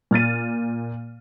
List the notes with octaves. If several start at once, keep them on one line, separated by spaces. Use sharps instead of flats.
A#2 F6 A6 D#7